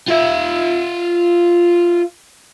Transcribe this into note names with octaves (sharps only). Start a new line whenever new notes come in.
F4 E5